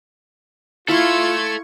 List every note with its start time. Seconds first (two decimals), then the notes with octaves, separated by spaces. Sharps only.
0.88 E4 F4 A4 E5 F5 C6 C#6 G#6